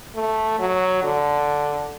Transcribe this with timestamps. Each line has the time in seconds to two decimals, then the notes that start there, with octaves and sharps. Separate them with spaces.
0.15 A3
0.59 F#3
1.03 D3